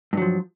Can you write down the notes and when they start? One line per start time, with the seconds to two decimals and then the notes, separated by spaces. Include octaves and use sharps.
0.13 G2
0.17 F#3
0.22 F3